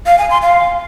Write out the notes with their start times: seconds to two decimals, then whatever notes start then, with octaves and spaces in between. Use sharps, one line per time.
0.06 F5
0.18 G#5
0.30 C6
0.42 F5